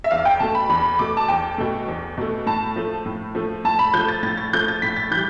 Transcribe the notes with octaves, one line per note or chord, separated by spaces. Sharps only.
E5
E2 F5
G5
B2 A3 A5
B5
E2 B5
B2 A3 D6
A5
E2 G5
B2 A3
E2
B2 A3
A2 A5
F3 A3
A2
F3 A3
A2 A5
B5
F3 A3 G6
A6
A2 A6
A6
F3 A3 G6
A6
A2 B6
A6
E3 G3 G6